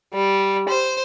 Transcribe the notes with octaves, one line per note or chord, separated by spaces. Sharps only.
G3
C5